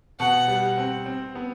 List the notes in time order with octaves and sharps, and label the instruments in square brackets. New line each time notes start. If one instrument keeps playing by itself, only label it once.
[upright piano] B2 [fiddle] F#5
[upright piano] G3
C4
C4
B3